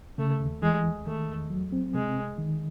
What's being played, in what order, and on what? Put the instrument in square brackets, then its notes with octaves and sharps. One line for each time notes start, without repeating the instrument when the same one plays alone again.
[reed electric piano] C#3 [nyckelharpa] A3
[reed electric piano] D#2
[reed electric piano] E3 [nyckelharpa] G#3
[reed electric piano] D#2
[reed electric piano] D#3 [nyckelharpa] A3
[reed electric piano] E2
F#3
C4
[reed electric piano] C3 [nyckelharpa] G#3
[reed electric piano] C2
D#3